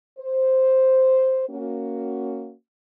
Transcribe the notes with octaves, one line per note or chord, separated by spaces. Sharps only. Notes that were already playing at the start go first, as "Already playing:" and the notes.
C5
A#3 C#4 F#4